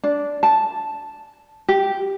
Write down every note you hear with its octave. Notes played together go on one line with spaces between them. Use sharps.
D4
A5
G4